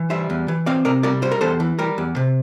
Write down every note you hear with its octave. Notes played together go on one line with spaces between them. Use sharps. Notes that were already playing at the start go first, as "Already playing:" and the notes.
Already playing: E3
G3 C5 E5
E2
E3
C4 D5 F5
C3 A#4 D5
G3 A#4 D5
G3 C5
A#4
E2 A4 C5
E3
G3 G4 A#4
E2
C3